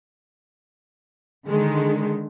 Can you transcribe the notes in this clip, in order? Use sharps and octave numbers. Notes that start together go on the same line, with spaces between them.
D3 D#3 G#3